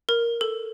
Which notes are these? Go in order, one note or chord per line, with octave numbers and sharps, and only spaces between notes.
A#4
A4